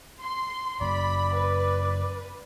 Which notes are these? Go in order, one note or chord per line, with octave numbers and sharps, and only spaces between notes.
C6
F#2 C#3 D5 B5
B4